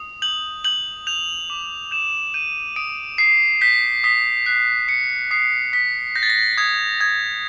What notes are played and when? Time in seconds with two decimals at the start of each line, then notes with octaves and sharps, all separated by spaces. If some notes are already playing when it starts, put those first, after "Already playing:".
Already playing: D#6
0.22 G6 F#7
0.65 G6 F#7
1.07 G6 F7
1.50 D6
1.91 G6 E7
2.34 G6 D#7
2.76 D#6 D7
3.18 D#6 C7
3.61 G6 B6
4.04 D#6 B6
4.46 F#6 C7
4.88 D#6 C#7
5.31 D#6 C7
5.73 D#6 B6
6.15 G6 A#6
6.23 A6
6.30 A#6
6.57 D#6 G#6
7.00 D#6 G#6